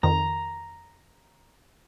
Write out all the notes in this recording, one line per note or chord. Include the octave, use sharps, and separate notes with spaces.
F2 D#3 A#5